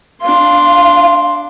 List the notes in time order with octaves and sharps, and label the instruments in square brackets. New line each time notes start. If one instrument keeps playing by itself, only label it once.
[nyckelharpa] D4 C6 [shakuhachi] F5